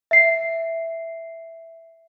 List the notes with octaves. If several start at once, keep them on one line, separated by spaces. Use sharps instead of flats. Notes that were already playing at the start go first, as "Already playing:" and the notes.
E5 C7